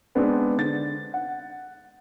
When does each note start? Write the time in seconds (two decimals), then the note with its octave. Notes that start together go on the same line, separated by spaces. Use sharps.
0.15 G#3 B3 C4 D4
0.57 D3 A6
1.14 F#5